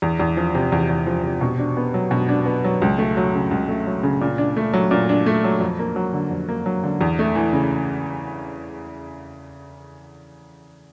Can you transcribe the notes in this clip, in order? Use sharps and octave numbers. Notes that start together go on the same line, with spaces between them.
E2
E2
F3
C3
E2
E2
F3
C3
B2
D4
B3
F#3
B2
D4
B3
F#3
C#2
A3
F#3
C#3
C#2
A3
F#3
C#3
A#2
D4
A3
F#3
A#2
D4
A3
F#3
F2
A#3
F#3
D3
F2
A#3
F#3
D3
E2
A3
E3
C#3